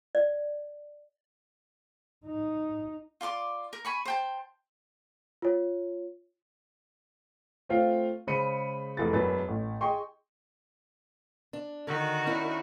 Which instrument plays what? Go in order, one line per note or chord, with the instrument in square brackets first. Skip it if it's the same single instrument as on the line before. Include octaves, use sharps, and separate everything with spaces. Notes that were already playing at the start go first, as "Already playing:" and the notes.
[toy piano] D5
[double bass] D#4
[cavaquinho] F4 D5 C6 D6
A#4
G#5 B5 C#6
C5 G5 A5
[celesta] F4 C#5
[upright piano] A3 C4 F4 F5
C#3 G#3 C5 B5 C#7 D#7
F1 E3 G#4 A6
E1 F#2 B4 A6
A1
G#4 D#5 G5 C6 C#6
[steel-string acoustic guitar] D4
[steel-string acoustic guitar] D3 [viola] D#3 F#4
[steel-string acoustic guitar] C#4 D4 E4